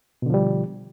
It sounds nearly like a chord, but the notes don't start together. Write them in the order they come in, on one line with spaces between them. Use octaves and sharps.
B2 D3 F3 G3